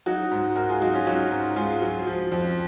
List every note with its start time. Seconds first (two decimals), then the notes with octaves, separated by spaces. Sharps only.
0.06 F#3 D#4 F#4
0.31 G#2
0.56 G#2 F#4 A#4
0.69 F4 G#4
0.81 F#3 D#4 F#4
0.93 C#4 F4
1.06 F#3 D#4 F#4
1.31 G#2
1.56 G#2 F4 G#4
1.82 F#3
2.07 F3
2.32 F2